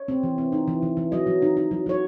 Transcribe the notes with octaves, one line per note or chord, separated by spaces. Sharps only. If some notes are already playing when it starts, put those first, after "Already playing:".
Already playing: C#5
C4
E3
C4
D#4
E3
E3
E3
F#3 D#5
F#3
D#4
D#4
F#3
F#3 C#5